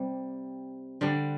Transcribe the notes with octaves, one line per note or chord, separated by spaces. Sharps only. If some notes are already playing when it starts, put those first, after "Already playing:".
Already playing: C3 G3
D3 G3 D4